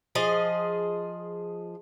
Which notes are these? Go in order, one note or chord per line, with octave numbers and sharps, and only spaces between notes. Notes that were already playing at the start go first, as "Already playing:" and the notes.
F3 G#4 D#5